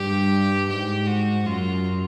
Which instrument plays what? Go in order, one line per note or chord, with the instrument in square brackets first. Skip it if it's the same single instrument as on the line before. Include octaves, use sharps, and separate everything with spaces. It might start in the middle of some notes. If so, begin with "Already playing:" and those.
Already playing: [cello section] G2 [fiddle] G4
[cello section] G#2 [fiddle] G4
[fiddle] F#4
[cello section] F#2 [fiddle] F4